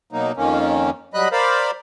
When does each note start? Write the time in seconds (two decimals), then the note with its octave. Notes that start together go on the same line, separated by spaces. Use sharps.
0.13 B2 F#3 A#3 D#4
0.37 F2 D#3 A#3 C#4
1.14 F#3 G3 D#5 B5 F#6
1.32 A#4 C5 D5 F5 B5